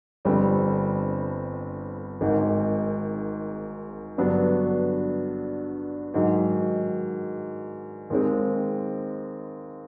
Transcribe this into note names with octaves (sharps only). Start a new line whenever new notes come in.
G1 F2 D3 G3 C4
G#1 G#2 D#3
G2 D3 F#3 B3 D4
G#2 D#3 F#3
D#2 D#3 G#3 C4